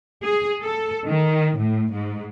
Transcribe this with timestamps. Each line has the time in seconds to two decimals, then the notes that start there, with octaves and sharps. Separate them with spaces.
0.22 G#4
0.62 A4
1.06 D#3
1.58 A2
1.92 G#2